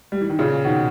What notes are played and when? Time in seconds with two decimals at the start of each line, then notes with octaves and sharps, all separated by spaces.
0.12 G3
0.21 E3
0.30 D#3
0.39 A#2 C#3
0.65 B2 D#3